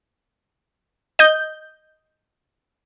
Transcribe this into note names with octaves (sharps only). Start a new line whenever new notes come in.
D#5 G6